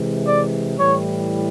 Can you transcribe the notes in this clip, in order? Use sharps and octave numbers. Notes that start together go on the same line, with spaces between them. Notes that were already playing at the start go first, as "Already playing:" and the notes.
Already playing: C3 E3 G#3
D5
A2 E3 G3 C#5